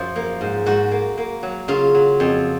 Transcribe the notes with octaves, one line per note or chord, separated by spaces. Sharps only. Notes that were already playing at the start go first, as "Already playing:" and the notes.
Already playing: F#2 F3 C#4 F4
A#3
G#2
G#2 F#4
A#3
A#3
F#3
C#3 F4
F#3
F2